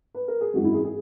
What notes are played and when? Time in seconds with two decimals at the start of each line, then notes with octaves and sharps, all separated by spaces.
0.15 B4
0.28 A#4
0.41 G#4
0.54 G#1 F#2 E3 G#3 F#4
0.64 E4
0.74 G#4
0.85 G#4